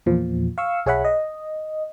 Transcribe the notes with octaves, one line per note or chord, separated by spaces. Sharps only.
E2 A#2 F3
F5 C#6 E6
B1 G#4 C#5 E5 F#5 B5
D#5